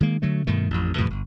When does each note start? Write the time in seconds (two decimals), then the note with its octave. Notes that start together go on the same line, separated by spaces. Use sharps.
0.01 D#3 G#3 A#3
0.22 D3 F#3 A3
0.47 G2 B2 D#3 A3
0.70 A1 F2
0.96 F2 A2 C3 E3
1.10 G1